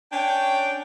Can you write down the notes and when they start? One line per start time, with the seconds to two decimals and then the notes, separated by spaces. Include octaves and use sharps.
0.12 C#4 D4 C#5 G5